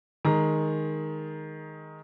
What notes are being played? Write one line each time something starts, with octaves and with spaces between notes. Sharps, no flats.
D#3 G#3 A#5